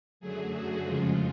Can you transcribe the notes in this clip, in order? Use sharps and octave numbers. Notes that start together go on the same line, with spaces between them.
F#2 D3 F#3 A3 G#4
F#4
F2 C#3 F3 G#3 F4